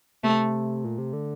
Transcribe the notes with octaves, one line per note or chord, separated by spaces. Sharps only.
C3 A3
A#2
C3
D3